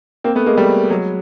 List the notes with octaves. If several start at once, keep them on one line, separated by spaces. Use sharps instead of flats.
A#3 C4
A3 B3
G#3 A#3
G3 A3
F#3 G#3